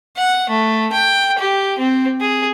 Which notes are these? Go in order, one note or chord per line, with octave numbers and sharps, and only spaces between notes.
F#5
A3
G5
G4
C4
G#4